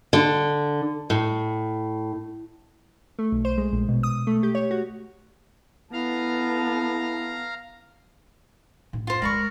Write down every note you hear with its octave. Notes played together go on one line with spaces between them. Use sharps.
D3
A2
A3
B1
C5
G#3
A#1
B2
D#6
A3
G4
C#5
F#4
B3 E4 A4 F5 A#5
F#2 A2
F4 C5
G#3 C4 A#4 D5 B5 C#6